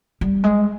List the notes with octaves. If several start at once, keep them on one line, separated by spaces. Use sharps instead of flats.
G3
G#3